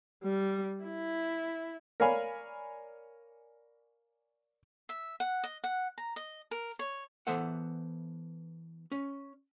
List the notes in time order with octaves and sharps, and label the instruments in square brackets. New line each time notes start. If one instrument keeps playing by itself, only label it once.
[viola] G3
E4
[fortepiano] A#4 C#5 D5 F5 G#5 B5
[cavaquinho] E5
F#5
D#5
F#5
A#5
D#5
A#4
C#5
[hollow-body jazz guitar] E3 B3 A4 C5 E5 F#5
C#4